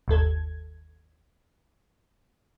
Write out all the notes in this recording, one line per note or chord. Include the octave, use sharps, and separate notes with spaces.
G1 D#2 A4 G#6